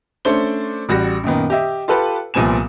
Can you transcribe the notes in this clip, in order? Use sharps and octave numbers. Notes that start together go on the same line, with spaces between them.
A3 C#4 D4 C5 G7
A1 G3 F#4 B5 A#6
F#2 A#2 D#3 B3
G4 D#5 E5
F4 G4 A4 B4
C2 A#2 F3 B3 G#5 E7